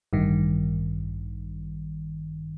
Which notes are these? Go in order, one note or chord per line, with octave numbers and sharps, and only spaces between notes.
A1 G2 D#3